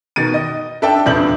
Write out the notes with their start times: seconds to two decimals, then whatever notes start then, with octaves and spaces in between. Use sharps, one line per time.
0.16 B2 D#3 A6 D#7
0.34 D#5
0.82 D4 A4 E5 G5 A5
1.06 D#1 E2 D4 E4 G6 F#7